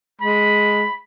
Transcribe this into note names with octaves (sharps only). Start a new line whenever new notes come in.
G#3 B5